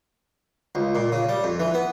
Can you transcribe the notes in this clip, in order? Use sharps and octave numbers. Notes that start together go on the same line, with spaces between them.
C#2
A#2
C#3
G3
F2
E3
B3